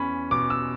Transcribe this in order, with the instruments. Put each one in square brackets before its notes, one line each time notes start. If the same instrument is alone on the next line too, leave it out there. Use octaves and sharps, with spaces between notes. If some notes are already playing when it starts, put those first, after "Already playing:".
Already playing: [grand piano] E2 C#4 B5
B2 D6
E6